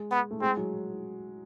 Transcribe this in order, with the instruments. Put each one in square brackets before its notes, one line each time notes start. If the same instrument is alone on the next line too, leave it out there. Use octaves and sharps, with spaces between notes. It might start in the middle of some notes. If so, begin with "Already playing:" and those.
Already playing: [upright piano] G#3
[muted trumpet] B3
[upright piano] A3
[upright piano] G#3 [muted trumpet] C4
[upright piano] F#3